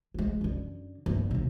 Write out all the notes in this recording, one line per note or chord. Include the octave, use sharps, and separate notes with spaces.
G3 G#3
F#2 D3
G1 D#3
D#2 B2